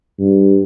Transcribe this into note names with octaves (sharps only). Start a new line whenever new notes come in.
G2